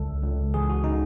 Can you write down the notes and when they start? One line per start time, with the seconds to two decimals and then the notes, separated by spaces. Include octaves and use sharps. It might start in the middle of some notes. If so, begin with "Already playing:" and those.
Already playing: C#2 A4
0.23 C#2
0.54 E3 G#4
0.70 F#4
0.84 C#3 D#4